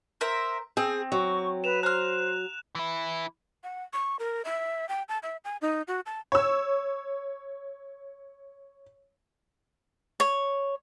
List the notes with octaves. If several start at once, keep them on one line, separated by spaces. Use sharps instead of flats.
A#4 C5 E5
C4 G#4
F#3 C#6
B4 E7 F7
C5 A#5 F6 F#6
E3 E4
F#5
C#6
A#4
E5
G5
A5
E5
G#5
D#4
F#4
A5
C#5 E6
C#5